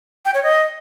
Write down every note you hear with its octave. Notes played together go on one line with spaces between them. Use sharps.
G5
C#5
D#5